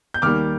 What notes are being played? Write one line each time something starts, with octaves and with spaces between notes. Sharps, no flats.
G6
D#2 D#3 G3 A#3 D6 F6